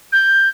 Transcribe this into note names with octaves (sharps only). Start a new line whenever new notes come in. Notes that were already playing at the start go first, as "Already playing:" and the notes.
G6